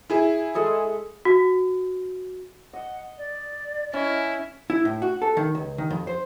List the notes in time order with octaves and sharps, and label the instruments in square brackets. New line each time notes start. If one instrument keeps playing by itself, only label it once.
[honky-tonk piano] E4 G#4
[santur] G#3 A4 D#5
[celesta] F#4
[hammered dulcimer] D#5 [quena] F#5
[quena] D5
[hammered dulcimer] C#4 [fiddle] E4 [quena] D#5
[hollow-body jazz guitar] E4
A2
F#4
A4
D#3
C#2
D#3
F2
C5